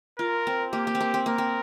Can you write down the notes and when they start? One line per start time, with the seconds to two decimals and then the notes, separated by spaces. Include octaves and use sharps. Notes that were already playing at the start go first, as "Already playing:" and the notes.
0.19 F4 A#4
0.47 C4
0.73 A#3 G4
0.87 A#3
0.95 C4
1.01 A#3
1.14 C4
1.26 A#3 A#4
1.38 C4